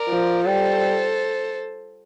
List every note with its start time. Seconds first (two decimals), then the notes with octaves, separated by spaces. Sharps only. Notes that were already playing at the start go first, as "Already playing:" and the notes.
Already playing: A#4 D5
0.09 F3
0.45 G3 A4 C5